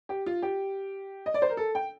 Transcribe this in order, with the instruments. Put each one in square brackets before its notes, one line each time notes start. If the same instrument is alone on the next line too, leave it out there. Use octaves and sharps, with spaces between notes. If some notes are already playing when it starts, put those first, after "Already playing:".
[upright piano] G4
F4
G4
D#5
D5
C5
A#4
A4
G5